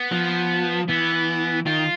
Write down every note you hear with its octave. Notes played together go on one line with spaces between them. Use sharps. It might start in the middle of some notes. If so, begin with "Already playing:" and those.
Already playing: B3
F3
E3 B3
D#3 F4